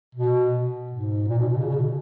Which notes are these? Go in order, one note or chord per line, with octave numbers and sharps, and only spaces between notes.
B2
G#2
A#2
B2
B2
C#3
C#3
B2